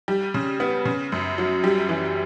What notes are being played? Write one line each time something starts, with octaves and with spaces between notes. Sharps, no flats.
G3
C#3
B3
C#3
F#2
F#3
G3
E3